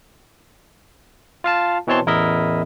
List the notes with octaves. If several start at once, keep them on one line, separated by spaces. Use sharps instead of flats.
F4 F5 A5
B2 E3 C4 C#5 A5 C6
A1 E2 E4 A#4 D#5 E5